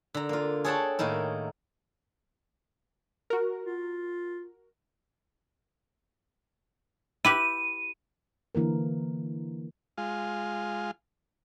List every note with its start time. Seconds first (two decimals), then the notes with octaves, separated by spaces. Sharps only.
0.14 D3 A#5
0.29 A#3 F4
0.64 G#4 A4 C#5 F#5 G5 A5
0.99 A2 D#3 A#3 D#4 E4
3.30 F#4 A#4
3.65 F4
7.25 E4 G4 B4 D#7
8.55 D3 E3 A#3 A#4
9.98 G#3 F4